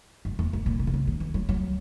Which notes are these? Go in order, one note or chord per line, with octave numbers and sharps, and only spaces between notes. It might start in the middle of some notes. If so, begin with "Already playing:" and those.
F#2
E2
F#2
A#2
B2
D#3
C#3
D#3
E3
F#3
F#3